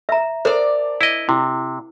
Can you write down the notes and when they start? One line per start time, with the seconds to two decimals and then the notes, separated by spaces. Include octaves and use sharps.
0.09 E5 A#5
0.45 D4 A#4 C5 D5 A#5
1.01 E4 D#5
1.29 C3 E4